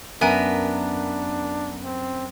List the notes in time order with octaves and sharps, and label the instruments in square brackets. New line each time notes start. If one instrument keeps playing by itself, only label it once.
[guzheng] F#2 [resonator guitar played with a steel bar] B3 A#4 [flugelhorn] D4 [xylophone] E5 G#5 F#6
[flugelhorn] C4